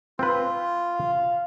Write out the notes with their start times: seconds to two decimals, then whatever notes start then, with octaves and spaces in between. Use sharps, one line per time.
0.19 C4 F4 B4
0.95 F5